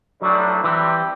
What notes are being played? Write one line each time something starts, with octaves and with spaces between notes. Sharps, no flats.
B1 A2 F#3 G3 D4
C3 E3 G3 C4 G4